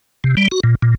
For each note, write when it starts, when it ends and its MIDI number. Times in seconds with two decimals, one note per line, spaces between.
0.24 0.35 48
0.37 0.48 55
0.52 0.60 66
0.63 0.75 46
0.82 0.95 46